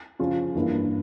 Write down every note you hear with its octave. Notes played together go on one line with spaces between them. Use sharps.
C#3 F3 C#4 F4
G2 E3 A#3 E4